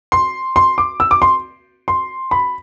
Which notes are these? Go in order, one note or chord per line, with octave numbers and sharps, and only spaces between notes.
C6
C6
D6
E6
D6
C6
C6
B5